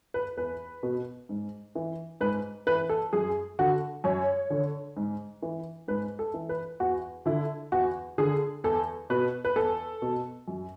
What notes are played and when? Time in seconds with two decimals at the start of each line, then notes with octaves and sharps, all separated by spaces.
0.14 B4
0.37 E2 B4
0.83 B2
1.29 G#2
1.75 E3
2.21 G#2 B4
2.67 E3 B4
2.89 A4
3.13 F#2 G#4
3.59 D3 F#4
4.04 F#2 C#5
4.50 D3
4.97 G#2
5.42 E3
5.88 G#2 B4
6.19 A4
6.34 E3
6.49 B4
6.80 E2 F#4
7.26 D3 E4
7.72 E2 F#4
8.18 D3 G#4
8.64 E2 A4
9.10 B2 B4
9.45 B4
9.56 E2 A4
10.02 B2
10.48 F#2